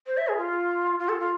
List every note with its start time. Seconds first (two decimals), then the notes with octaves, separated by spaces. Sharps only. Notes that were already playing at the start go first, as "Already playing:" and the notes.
0.07 C5
0.17 E5
0.28 G#4
0.37 F4
0.99 F4
1.09 A4
1.19 F4